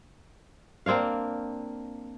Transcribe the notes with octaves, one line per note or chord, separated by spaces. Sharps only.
A#3 C4 D4 F5